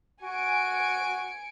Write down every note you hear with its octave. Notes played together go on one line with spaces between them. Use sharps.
F#4 G#5 C#7 D7